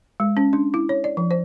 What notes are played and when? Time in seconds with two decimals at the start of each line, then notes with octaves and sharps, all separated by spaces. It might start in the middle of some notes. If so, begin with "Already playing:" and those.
0.20 G#3
0.37 C#4
0.53 D4
0.74 E4
0.89 C#5
1.04 D5
1.17 F3
1.31 C5